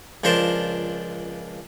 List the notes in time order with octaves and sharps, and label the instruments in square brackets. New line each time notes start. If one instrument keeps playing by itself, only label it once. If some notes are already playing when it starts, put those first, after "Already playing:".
[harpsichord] C#2 F3 D4 A#4 C5 A5